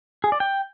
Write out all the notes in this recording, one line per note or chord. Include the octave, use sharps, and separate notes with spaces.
G#4
D5
G5